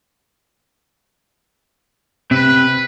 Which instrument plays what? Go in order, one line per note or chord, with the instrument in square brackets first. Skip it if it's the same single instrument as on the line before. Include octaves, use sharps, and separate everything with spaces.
[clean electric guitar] C3 C4 [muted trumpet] B4